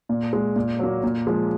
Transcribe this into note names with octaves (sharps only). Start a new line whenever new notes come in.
A#2
G#3
A#2
F#3 A#3
A#2
F3 G#3